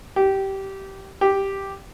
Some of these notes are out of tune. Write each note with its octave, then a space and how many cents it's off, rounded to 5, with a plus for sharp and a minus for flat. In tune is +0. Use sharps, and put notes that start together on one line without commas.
G4 -15
G4 +0